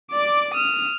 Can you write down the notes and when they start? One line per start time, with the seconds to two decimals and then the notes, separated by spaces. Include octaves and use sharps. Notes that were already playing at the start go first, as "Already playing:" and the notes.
0.12 D5 D6
0.54 D#6 F6